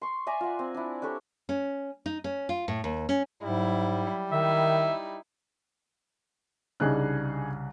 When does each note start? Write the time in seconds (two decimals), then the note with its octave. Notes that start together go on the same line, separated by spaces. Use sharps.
0.02 C6 C#6
0.27 D5 E5 G#5 A#5
0.41 F4 F#5
0.59 C4
0.74 D4 E4
1.02 D4 G4 A4 C#5
1.49 C#4
2.06 D#4
2.24 C#4
2.49 F4
2.68 A2
2.84 D#2
3.09 C#4
3.43 G#2 F#3 G3 E4
4.32 D#3 D#4 E4 E5
6.80 C2 C#3 D4 D#4 G#4 F#6